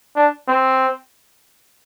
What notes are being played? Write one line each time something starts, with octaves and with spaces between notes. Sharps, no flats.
D4
C4